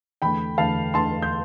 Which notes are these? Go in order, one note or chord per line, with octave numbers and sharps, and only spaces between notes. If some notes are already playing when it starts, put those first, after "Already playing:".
E2 D3 A3 G5 B5
E2 D3 A3 F5 A5
E2 D3 A3 A5 C6
G6